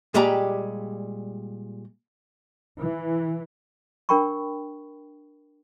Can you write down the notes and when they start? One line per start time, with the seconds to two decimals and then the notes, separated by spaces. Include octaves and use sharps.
0.14 A#2 G3 G#3 G4 D5 A#5
2.81 E3
4.09 D4 A#4 G5 B5 C#6